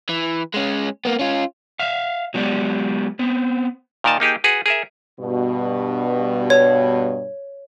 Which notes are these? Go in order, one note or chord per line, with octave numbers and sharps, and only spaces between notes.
E3
G#3 C#4
A#3 B3
C#4 F4
E5 F5
F#3 G#3 B3 G4 D5
B3 C4
A#2 D#3 A#4 D#5 A5
A#3 D#4 G4 G#4
F#4 G#4 B4
G#4 A#4 E5
G2 B2
C#5